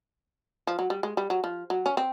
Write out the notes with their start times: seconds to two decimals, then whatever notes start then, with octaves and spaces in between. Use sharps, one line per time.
0.67 F3
0.79 F#3
0.90 G3
1.03 G#3
1.17 G3
1.30 F#3
1.44 F3
1.70 F#3
1.86 C#4
1.97 C4